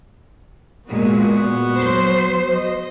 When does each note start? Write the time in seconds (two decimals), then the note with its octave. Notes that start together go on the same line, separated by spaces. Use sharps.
0.88 A#2 G#3 B3 F#4
1.76 F#3 C5
2.52 D#5